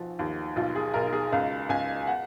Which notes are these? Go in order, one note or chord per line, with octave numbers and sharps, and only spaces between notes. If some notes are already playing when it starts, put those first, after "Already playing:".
Already playing: B1 F3 F#4
D#2
B1 F4
G#4
B1 A#4
G#4
C#2 F5
C#2 G#5
F#5